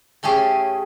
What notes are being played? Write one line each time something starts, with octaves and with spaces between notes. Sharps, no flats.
A2 A3 C#4 G4 G#4